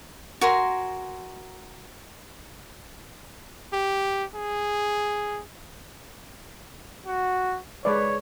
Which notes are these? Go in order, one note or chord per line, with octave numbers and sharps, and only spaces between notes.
F#4 A#4 G#5 C6
G4
G#4
F#4
G#3 B4 C#5 D5